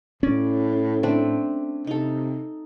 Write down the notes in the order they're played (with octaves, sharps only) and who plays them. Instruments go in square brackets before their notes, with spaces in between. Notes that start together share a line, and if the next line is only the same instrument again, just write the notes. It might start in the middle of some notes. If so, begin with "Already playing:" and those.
[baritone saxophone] A2 [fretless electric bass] C#4 [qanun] D5
[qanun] A3 C4 D4
[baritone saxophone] C3 [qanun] D#4 A4